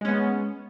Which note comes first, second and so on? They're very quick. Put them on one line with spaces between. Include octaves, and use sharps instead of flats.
G#3 C#4 B3